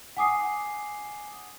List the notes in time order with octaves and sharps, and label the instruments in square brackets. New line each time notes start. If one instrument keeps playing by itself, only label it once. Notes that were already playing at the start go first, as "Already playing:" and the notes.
[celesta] F#5 G#5 D6 D#6 C7